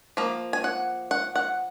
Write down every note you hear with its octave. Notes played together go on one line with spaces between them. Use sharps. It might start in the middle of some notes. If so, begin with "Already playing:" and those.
F3 A#3
G#5
F#5
F#5
F#5